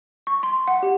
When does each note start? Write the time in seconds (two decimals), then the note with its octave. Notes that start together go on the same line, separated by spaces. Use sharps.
0.27 C#6
0.43 C6
0.68 F#5
0.83 G4